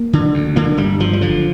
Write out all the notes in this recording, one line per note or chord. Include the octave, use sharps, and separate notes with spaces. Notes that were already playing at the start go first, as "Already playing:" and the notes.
Already playing: A#3
D3
D2
D3 A#3
G1 G3
G1 F3
G3
D3 F3